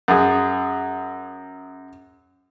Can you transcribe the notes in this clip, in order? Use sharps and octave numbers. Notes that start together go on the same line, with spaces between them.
F#2 G#4